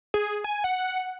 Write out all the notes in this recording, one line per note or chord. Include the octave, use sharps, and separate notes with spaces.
G#4
G#5
F#5